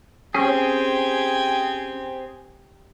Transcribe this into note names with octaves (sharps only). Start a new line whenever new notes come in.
C4 C#4 G4 G#4 G#5